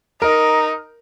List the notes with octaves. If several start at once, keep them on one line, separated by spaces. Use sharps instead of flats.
D#4 A#4